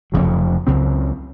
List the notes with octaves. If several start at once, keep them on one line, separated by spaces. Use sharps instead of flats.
F1 F2 C#3 F#3
C#2 C#3 F#3 C4